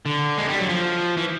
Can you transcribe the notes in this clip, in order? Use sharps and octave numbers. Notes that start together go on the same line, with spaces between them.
D3
G#3
G3
F#3
F3
E3